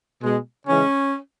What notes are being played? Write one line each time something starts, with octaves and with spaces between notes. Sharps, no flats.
B2 G#3
C#3 E3 G#3 C#4